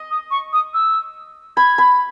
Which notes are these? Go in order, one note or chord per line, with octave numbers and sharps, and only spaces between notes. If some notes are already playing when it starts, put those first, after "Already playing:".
Already playing: D#5
D#6
C#6
D#6
E6
B5 G#6
B5